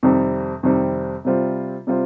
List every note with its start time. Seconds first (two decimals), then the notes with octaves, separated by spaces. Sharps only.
0.03 F2 C3 D#3 G3 C4
0.63 F2 C3 D#3 G3 C4
1.25 C3 G3 C4 F4 C5
1.87 C3 G3 C4 F4 C5